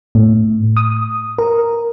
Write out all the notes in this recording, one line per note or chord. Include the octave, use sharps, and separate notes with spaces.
A2
D#6
A#4